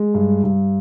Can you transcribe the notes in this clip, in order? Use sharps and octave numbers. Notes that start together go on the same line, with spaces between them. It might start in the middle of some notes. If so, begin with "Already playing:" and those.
Already playing: G#3
G2
G2